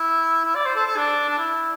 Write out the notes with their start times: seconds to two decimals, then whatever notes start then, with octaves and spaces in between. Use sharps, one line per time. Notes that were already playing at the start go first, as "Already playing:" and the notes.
Already playing: E4
0.45 E4
0.55 D5
0.65 C5
0.76 A4
0.86 A4
0.97 D4
1.29 D4
1.38 E4